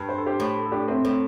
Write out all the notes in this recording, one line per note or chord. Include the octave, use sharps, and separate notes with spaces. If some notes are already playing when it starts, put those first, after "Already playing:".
Already playing: G2
C5
A4
G4 C5
A2
A4
D4 G4
C4 E4
A2 C4